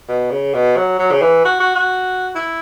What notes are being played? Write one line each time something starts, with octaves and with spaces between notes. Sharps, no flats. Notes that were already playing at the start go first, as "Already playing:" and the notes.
B2
C#3
B2
F#3
F#3
C#3
E3
F#4
F#4
F#4
E4